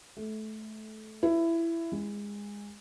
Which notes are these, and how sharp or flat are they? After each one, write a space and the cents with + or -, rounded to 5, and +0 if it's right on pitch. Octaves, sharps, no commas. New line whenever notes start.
A3 -20
E4 +15
G#3 -20